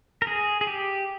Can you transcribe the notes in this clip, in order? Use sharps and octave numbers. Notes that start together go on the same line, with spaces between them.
A#4
G#4
G#4
G4